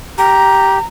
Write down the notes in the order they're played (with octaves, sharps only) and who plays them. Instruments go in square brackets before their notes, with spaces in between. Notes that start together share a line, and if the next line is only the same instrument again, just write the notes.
[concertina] G4 [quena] A#5